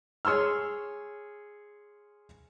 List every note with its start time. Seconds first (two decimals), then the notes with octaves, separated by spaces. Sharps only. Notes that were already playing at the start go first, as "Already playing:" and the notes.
0.25 G#4 C#5 C6 E6 F6